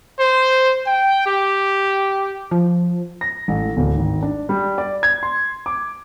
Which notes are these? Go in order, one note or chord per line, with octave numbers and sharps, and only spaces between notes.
C5
G5
G4
F3
A#6
A1
D1
G#1
D4
G3
D5
G#6
C6
D6